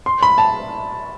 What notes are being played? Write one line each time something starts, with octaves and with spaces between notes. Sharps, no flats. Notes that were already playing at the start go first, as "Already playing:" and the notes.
C6
B5
A5